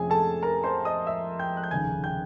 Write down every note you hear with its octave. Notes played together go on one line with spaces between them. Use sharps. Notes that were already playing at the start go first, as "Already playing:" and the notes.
Already playing: F2 C3 F3 A3 C#4 G#4 G#5
A4 A5
A#4 A#5
C5 C6
D#5 D#6
E5 E6
G5 G6
F#6
G6
F1 D#2 C#3 G#5 G#6
G5 G6